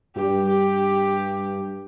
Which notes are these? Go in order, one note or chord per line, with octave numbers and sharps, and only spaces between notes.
G2 G4
G4